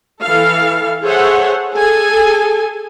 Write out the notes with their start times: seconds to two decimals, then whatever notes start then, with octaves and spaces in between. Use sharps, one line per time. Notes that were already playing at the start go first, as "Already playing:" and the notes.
0.22 E3 A4 F5
1.04 G#4 A4 C5 C#5 E5 F#5
1.74 G#4 A4 G#5